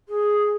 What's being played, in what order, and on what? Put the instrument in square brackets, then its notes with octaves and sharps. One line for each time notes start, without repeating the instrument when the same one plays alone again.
[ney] G#4